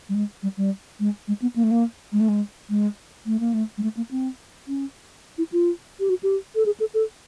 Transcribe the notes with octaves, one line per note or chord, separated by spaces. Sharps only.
G3
G#3
G3
G3
G#3
G#3
B3
A#3
A3
A#3
G#3
A3
G#3
G#3
A3
A#3
A3
G#3
A3
A#3
C4
C#4
E4
F4
G4
F#4
G4
A4
G#4
A4
A4